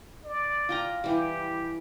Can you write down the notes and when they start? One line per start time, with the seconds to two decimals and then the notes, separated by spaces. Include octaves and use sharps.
0.25 D5
0.69 F4 G5 A#5
1.04 E3 G3 G4